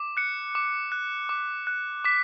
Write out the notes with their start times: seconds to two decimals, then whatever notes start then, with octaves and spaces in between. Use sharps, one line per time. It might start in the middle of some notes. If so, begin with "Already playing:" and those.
Already playing: D6
0.17 F#6 C#7
0.55 D6
0.92 F#6
1.29 D6
1.67 F#6
2.04 D6 B6